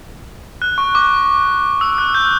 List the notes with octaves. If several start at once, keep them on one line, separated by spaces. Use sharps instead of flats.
F#6
C#6
D6
E6
F#6
G6